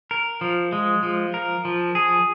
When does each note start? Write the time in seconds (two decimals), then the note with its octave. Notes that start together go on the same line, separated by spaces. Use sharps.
0.11 A#4
0.41 F3
0.72 G#3
1.03 F3
1.34 A#4
1.65 F3
1.95 G#4